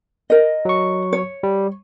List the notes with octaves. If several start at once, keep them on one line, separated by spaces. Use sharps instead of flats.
A#4 D#5
F#3 C#6
C#5
G3